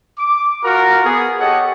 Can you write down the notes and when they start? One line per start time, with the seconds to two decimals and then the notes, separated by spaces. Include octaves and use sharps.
0.19 D6
0.64 F4 F#4 A#4
1.05 B3 G#4
1.40 G4 A4 C#5 D#5 F#5